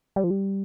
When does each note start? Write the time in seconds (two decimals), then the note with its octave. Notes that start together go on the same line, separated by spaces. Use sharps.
0.16 G3
0.24 F3
0.30 G3